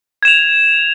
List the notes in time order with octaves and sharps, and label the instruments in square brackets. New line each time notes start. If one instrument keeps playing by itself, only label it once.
[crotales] G#6
E7
F7